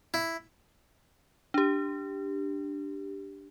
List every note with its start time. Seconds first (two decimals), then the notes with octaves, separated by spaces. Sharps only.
0.14 E4
1.54 D4 G4